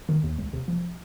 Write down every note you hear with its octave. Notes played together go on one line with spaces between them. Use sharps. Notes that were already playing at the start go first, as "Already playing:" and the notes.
D#3
D#2
C#2
C3
F3